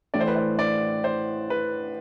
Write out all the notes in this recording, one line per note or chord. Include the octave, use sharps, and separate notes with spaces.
A1 A2 E3 A3 D5
C5
B4
C5
D5
C5
B4